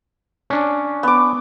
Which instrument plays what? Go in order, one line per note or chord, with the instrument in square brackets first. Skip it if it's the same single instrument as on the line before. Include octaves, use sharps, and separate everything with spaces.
[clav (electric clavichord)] C#4 D4
[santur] B3 D6